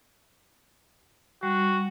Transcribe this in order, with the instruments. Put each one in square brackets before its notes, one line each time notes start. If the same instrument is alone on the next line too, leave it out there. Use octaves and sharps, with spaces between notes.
[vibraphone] G3 [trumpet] F#4